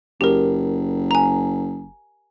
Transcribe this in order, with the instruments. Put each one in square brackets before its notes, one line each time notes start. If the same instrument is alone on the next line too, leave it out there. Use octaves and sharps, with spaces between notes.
[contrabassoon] F#1 [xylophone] G4 A#4
[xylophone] G#5 A#5